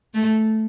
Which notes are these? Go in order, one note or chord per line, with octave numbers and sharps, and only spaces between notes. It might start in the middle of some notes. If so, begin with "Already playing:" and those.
A3